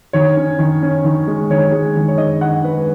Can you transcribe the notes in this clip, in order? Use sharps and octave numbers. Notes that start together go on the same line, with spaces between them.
D#3 C#5
C#4
D#3
C#4
D#3
G#3
D#3 C#5
G#3
D#3
C#5
D#3 D#5
D#3 F#5
G#3 B4